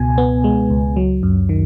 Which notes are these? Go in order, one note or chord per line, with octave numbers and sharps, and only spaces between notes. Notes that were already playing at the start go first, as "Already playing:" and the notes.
Already playing: C#2 B2 G#5
B3
G#3
C#2
F#3
F#2
D#3